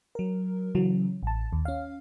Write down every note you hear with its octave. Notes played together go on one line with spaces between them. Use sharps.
F#3 A#4
C#3 E3 F#3
A1 A5
D#2
C#4 F5